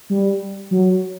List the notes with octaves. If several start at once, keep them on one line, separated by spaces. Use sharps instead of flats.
G3
F#3